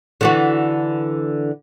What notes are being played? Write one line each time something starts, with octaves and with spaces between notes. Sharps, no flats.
D3 E3 F#4